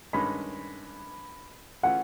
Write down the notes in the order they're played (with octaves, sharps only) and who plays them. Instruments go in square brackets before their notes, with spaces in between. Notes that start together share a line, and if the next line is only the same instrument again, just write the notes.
[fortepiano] G2 D#3 G#3 C#4 [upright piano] B5
[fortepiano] E3 A3 C#4 F4 G#4 [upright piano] F#5